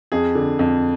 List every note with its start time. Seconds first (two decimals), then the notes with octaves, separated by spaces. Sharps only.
0.12 F2 G#4
0.35 D3
0.59 F2